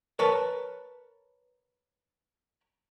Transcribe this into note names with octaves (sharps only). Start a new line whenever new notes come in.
A#4 B4 C#5 A5